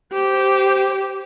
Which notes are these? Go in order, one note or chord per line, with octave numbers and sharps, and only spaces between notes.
G4 C5